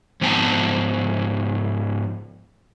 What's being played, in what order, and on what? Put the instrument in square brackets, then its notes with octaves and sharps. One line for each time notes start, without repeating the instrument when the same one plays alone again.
[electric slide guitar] G#2 F3 B3 G5 A5 A#5